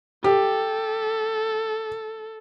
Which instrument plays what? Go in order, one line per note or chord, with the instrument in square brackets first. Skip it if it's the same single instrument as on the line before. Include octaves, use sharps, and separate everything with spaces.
[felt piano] G4 [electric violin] A4